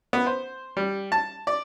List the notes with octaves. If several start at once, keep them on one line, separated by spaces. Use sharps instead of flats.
B3
C5
G3
A5
D5